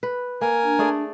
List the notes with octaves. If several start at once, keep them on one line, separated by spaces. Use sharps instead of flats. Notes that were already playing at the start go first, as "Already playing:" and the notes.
B4
A#3 A#4 G#5
D4
A3 G#4 D5